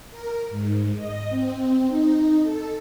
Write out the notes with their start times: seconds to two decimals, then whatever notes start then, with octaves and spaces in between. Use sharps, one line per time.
0.11 A#4
0.50 G#2
0.96 D#5
1.29 C4
1.87 D#4
2.42 A4